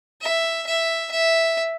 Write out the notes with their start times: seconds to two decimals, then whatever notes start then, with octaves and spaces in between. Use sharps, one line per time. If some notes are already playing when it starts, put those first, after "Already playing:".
0.21 E5
0.67 E5
1.12 E5